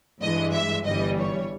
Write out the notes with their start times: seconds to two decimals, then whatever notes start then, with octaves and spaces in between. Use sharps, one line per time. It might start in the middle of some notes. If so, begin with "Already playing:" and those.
0.21 G2 E3 G#3 D#5
0.54 E5
0.86 G1 G2 E3 G3 D#5
1.20 C#5